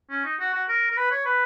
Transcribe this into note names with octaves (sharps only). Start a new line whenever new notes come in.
C#4
D#4
F#4
F#4
A#4
A#4
B4
C#5
B4